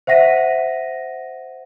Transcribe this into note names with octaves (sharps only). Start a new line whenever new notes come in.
C5 E5 F#5 A#6 B6 D#7